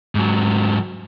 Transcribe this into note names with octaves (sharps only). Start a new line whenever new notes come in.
G#2 F#3